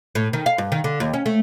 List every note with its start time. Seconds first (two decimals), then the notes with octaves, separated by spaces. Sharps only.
0.15 A2
0.33 D#3
0.46 F5
0.58 G2
0.72 D#3
0.84 D3
1.00 D#2
1.13 C#4
1.26 A3